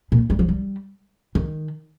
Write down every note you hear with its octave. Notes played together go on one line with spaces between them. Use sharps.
A#2
G3
F3
G3
D#3